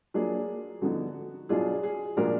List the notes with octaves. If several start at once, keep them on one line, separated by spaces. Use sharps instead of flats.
F#3 A#3 D4 F4 G#4
D3 F3 B3 D#4 F#4
B2 F#3 D4 F4 G#4
G#4
A#2 F3 G#3 D4 F4 F#4 A#4